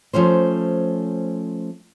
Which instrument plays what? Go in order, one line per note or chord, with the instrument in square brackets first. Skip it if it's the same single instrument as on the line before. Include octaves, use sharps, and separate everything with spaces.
[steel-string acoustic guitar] F3 A3 C#4 C5